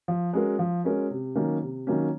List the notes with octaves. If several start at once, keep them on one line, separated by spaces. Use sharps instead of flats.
F3
G#3 C#4 F#4 A#4
F3
G#3 C#4 F#4 A#4
C3
D#3 F#3 A#3 C#4
C3
D#3 F#3 A#3 C#4